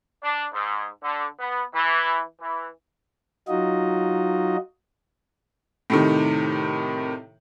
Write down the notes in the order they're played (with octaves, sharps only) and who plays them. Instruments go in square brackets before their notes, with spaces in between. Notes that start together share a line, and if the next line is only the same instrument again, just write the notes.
[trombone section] D4
G#2
D3
B3
E3
E3
[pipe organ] F#3 D#4 F4 F#4 D#5
[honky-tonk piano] A2 C3 D#3